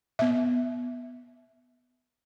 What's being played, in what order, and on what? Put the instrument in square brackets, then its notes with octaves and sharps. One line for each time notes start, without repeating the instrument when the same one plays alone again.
[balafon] B3 E5